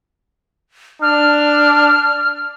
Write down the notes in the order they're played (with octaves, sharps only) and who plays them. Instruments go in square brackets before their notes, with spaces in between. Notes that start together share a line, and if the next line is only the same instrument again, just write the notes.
[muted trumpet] D4 [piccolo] F6